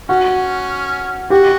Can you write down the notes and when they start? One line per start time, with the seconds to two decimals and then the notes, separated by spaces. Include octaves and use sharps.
0.09 C#4 F#4
1.30 F#4 G4